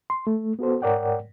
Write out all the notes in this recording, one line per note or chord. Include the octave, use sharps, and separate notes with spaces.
C6
A3
B3 F#4 A4 C5
G#2 A#4 C#5 D5 F#5 G5